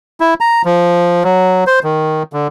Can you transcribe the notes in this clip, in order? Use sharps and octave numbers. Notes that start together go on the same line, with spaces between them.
E4
A#5
F3
F#3
C5
D#3
D3